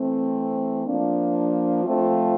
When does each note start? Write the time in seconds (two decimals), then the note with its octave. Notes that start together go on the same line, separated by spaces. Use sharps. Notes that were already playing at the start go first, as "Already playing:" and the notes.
Already playing: E3 A3 C4
0.86 F3 A#3 D4
1.84 F3 A3 C4 F4